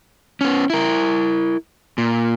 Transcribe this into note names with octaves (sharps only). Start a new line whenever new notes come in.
B3 C#4
E4 A#4
A#2